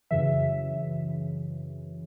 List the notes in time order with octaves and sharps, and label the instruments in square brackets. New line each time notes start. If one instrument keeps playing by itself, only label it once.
[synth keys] F#2 C#3 E3 E5